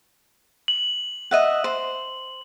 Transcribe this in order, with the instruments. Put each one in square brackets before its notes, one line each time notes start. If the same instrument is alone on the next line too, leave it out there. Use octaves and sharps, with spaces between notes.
[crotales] F#7
[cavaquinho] D#5 E5 F#5
C5